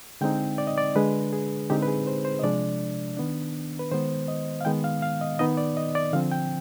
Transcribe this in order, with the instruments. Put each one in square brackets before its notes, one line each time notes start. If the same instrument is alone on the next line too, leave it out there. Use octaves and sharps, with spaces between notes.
[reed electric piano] D3 G#3 C4 D#4 G5
D5
D#5
D5
D3 G#3 D4 B4
G#4
D3 G#3 C4 D#4 G4
B4
G#4
C5
C5
D#5
C3 F3 G#3 D4 D5
D#3 B3 D4
B4
D#3 G#3 B3 C5
D#5
F5
D#3 G#3 B3 G5
F5
F5
D#5
D#3 B3 D#4 D#5
D5
D#5
D5
D3 F3 C4 F5
G5